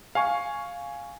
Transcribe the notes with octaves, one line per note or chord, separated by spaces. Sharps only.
F5 G#5 C#6